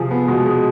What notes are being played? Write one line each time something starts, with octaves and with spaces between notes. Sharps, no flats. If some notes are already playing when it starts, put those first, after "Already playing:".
Already playing: C3 F3 G#4
B3
B2 G#3
G#3